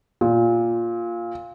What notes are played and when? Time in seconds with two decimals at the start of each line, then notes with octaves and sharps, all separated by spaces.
0.21 A#2